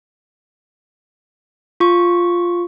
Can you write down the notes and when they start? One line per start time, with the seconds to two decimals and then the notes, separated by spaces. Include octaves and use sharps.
1.80 F4 C#6